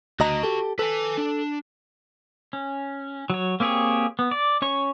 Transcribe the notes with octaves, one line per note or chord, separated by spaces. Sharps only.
D2 F#4 D#5 A5 A#5
G4 A4
A4 B4 G#5
D4
C#4
F#3 C#5
A#3 C4 G4 G#4 C#5
B3
D5
C#4 C#5 C#6